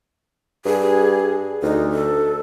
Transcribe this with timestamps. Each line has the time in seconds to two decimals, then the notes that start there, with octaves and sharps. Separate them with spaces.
0.65 G2 G#4
1.63 D2 D#4
1.92 A4